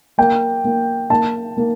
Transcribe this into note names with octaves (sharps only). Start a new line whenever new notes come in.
A#3 G5
A#3
A#3 A5
A#3